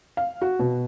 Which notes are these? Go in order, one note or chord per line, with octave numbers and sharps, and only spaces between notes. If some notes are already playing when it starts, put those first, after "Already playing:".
F5
F#4
B2